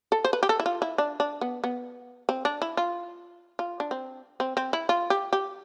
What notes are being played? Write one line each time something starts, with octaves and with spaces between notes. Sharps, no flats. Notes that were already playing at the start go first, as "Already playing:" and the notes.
A4
C5
B4
G4
A4
E4
F4
E4
D4
D4
B3
B3
C4
D4
E4
F4
F4
D4
C4
C4
C4
E4
F4
G4
G4